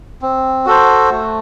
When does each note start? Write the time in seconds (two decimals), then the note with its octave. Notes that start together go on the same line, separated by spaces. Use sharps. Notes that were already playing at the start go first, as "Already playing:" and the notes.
0.22 C4
0.66 F#4 A4 C5
1.10 A3